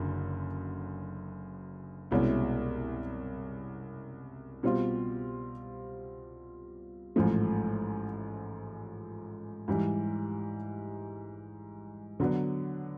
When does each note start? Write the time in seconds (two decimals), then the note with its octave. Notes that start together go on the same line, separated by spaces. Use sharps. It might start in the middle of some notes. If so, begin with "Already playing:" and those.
Already playing: F#1 F#2 D3
2.11 C2 B2 G#3 C#4 E4
4.63 B2 G3 C4 F4
7.16 A1 G#2 F3 A3
9.68 G#2 E3 G3
12.20 D3 F#3 B3 D4